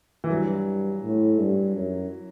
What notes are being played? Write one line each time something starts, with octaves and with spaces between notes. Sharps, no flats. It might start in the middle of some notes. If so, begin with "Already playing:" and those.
E3
G2 F#3
A2
G2
F#2